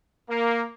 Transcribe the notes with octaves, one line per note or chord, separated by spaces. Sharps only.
A#3